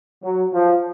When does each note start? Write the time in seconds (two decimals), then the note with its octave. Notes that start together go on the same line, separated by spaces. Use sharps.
0.22 F#3
0.53 F3